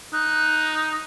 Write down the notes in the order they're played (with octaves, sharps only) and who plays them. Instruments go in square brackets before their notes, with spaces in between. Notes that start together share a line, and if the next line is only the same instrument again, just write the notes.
[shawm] D#4 [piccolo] F#6